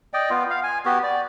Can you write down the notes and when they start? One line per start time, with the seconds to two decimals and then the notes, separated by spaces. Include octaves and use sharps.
0.14 D5 D#5 G5
0.30 B3 F4
0.50 F5
0.63 G#5
0.85 B3 F#4 G4
1.03 D5